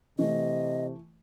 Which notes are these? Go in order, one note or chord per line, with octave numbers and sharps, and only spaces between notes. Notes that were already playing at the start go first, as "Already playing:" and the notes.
C3 E3 A3 D#5